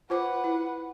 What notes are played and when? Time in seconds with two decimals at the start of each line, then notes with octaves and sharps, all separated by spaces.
0.10 F4 B4 C5 F#5 D6
0.44 E4